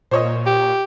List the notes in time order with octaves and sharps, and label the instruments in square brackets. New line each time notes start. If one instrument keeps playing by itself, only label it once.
[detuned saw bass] A#2 [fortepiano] C5 C#5 D#5
[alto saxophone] G4